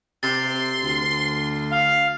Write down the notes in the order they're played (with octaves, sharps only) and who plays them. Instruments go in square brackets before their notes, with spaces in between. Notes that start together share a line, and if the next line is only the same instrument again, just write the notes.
[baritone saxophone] C3 [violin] C6 [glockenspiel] A6
[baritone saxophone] D2
[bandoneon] F5